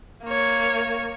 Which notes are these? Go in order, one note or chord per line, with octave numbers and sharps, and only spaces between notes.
A#3 C#5